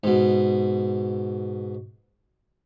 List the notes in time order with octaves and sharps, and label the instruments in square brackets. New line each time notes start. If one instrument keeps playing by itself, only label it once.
[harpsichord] G#2 B2